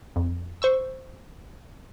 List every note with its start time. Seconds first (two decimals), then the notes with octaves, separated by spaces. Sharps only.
0.16 F2
0.62 C5 C#6 E6